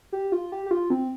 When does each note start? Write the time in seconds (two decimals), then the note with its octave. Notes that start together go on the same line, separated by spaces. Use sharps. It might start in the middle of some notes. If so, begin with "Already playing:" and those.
0.13 G4
0.32 F4
0.52 G4
0.66 G4
0.71 F4
0.90 C4